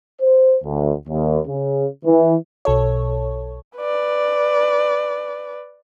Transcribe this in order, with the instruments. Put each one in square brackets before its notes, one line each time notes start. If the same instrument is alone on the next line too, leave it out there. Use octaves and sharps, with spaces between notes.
[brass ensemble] C5
D2
D#2
C#3
E3
[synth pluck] B1 A4 C#5
[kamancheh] B4 D5